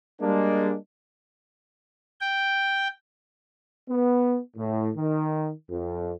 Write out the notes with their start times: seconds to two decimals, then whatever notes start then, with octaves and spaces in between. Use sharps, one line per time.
0.21 G3 G#3 A#3 D4
2.21 G5
3.89 B3
4.56 A2
4.96 D#3
5.69 F2